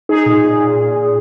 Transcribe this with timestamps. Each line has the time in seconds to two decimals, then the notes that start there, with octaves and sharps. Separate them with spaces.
0.09 D#4 G#4
0.26 A#2
0.44 A#2
0.61 A#2
0.78 A#2
0.96 A#2